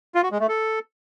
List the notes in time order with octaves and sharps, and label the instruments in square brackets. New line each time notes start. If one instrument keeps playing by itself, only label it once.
[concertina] F4
F#4
G#3
A3
A4